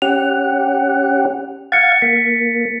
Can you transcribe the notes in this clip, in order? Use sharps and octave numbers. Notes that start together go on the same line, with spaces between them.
C#4 G4 F#5 F7
F5 F#5 G#6 A6 C#7
A#3 B6